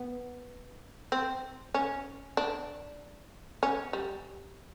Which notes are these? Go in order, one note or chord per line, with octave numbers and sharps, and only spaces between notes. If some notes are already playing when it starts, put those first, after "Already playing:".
Already playing: B3
C4
C#4
D4
C#4
G3